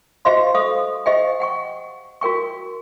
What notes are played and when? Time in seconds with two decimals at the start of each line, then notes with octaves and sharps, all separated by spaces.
0.25 F#4 G4 C5 D#5 F5 C6
0.54 A4 C5 F5 C#6 D#6
1.06 G4 C5 D#5 F5 G5
1.40 F#5 G5 C#6
2.21 F#4 A#4 G5 C#6